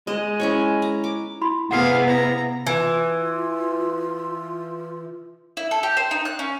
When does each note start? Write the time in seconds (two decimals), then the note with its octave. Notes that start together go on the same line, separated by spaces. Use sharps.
0.07 G#3 D#5
0.40 C#4 E4 C#5
0.82 A#5
1.04 D6
1.41 E4 B5 C6
1.71 C3 B3 E4 G#4 F5 F#5 C7
2.07 A#5
2.67 E3 F4
5.57 E4
5.71 A4
5.83 G4
5.97 C5
6.11 D#4
6.25 F#6
6.39 C#4